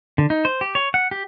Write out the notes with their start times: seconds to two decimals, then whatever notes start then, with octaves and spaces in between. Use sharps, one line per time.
0.18 D3
0.30 D#4
0.45 C5
0.61 G4
0.75 C#5
0.94 F#5
1.11 G4